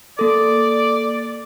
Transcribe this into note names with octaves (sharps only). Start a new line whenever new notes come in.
A#3 A4 D5 D6